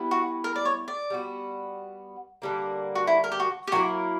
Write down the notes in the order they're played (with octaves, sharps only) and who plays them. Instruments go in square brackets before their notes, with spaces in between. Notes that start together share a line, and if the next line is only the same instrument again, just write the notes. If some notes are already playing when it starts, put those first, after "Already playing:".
Already playing: [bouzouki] G3 B3 E4 B4
[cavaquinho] F#4
A#4
D5
C#5
D5
[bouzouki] G3 B3 F#4
D3 G3 A#3
[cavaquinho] F#4
E4
A#4
G4
F#4
G4
[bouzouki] F#3 A#3 E4 A#4 [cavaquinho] F#4